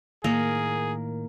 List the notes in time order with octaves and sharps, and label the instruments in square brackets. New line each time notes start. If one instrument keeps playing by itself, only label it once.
[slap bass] A2 D#3 [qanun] A#3 [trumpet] G#4